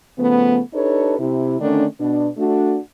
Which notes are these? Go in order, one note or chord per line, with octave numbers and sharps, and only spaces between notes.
C#3 F3 A3 B3
D4 D#4 G4 A4 B4 C#5
C3 E4
D3 D#3 A3 C#4 D4
B2 D4
A3 D4 F#4